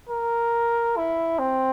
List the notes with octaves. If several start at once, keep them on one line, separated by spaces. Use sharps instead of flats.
A#4
E4
C4